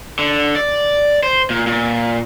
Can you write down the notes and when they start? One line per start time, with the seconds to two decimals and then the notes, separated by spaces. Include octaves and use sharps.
0.19 D3
0.56 D5
1.23 C5
1.50 A#2
1.67 A#2